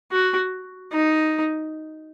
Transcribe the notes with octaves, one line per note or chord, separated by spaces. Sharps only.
F#4
D#4